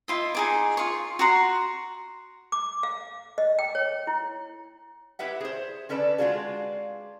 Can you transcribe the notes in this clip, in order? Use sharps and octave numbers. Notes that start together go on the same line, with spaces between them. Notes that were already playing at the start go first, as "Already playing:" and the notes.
E4 F4 D#5
D#4 G#4 D6
F4 C#6
F#4 F#5 A#5 C6
D6
F5
D#5
G5
C#5
E4
E4 G4 B4 E5 F#5
G#4 C5
D3 C#4 A4 B4 D5
G#3 C4 D4 F4 F#4 G#4